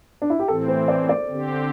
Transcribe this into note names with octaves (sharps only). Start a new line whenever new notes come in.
D4
E4
G4
A2 E3 C4 A4
C5
D5
D5
D3 C4 G4